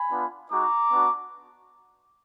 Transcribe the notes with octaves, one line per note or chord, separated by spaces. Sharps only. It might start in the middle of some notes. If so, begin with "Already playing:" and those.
Already playing: G#5 B5
B3 D4 F4
G#3 D#4 F#4 A#5 D6
B3 D4 F#4